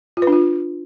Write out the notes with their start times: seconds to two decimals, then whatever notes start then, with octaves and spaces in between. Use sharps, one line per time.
0.17 F4
0.22 B4
0.27 D4
0.32 F4